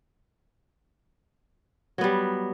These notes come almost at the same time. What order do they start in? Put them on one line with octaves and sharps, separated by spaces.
F#3 B3 G3